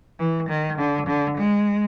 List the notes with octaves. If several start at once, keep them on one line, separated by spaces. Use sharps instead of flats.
E3
D#3
D3
D3
G#3